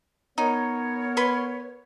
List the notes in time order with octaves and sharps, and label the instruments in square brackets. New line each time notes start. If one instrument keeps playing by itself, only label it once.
[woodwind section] B3 A#4 C#5 [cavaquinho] D#4
[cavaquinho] B4 C6 C#6